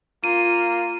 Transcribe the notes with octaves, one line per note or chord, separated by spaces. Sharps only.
A#3 F4 D#7